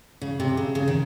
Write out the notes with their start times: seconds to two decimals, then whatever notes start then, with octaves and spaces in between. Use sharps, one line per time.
0.22 C#3
0.40 C3
0.57 C#3
0.75 C#3
0.88 D#3